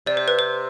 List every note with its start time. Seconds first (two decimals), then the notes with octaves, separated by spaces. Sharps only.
0.06 C3 D5
0.17 C5
0.28 B4
0.39 C5